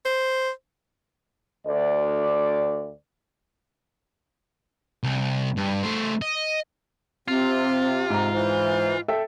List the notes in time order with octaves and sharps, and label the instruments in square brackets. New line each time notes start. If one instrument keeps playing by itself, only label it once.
[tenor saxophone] C5
[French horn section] D2 D5
[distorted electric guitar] C2
G2
A3 C5
D#5
[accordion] C3 [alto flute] C4 [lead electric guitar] F4
[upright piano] G#2 A#5
[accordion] E3 [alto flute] C5
[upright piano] A4 E5 G5